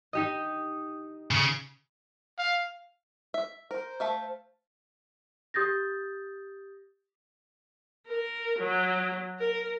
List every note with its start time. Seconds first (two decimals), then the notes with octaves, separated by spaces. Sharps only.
0.13 D#4 G4 D#5
1.31 C#3
2.39 F5
3.34 E5
3.71 A#4 C5
4.00 A3 E5 F5
5.54 G4 D#6 G6 A6 A#6
8.07 A#4
8.59 F#3
9.39 A#4